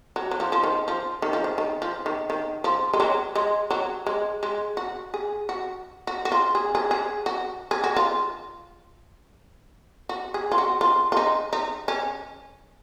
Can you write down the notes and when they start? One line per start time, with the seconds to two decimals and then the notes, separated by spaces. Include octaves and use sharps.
0.16 F#3
0.31 F#3
0.40 F3
0.52 F3
0.63 D#3
0.88 F3
1.22 D#3
1.33 F3
1.44 D#3
1.58 D#3
1.82 F3
2.06 D#3
2.30 D#3
2.64 F3
2.93 G#3
3.00 F#3
3.35 G#3
3.70 F#3
4.06 G#3
4.43 G#3
4.77 F#4
5.14 G#4
5.49 F#4
6.07 F#4
6.25 F#4
6.32 F4
6.55 G#4
6.75 G#4
6.91 G#4
7.26 F#4
7.71 G#4
7.84 F#4
7.96 F4
10.09 F#4
10.34 G#4
10.51 F4
10.58 F#4
10.81 F4
11.12 F4
11.17 D#4
11.53 D#4
11.88 C#4